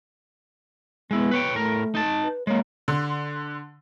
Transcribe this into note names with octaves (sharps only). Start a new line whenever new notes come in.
G#3 B3 E4
B4 C#5 G5
A2 A3 A#4
D#4 A5
B4
G#3 A#3 C#5
D3 C6